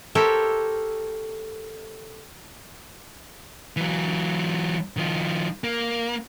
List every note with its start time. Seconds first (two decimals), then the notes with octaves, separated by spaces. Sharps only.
0.15 G4 A4 A#4 C5 C#5 E5
3.77 E3 F#3
4.97 D#3 F3
5.64 A#3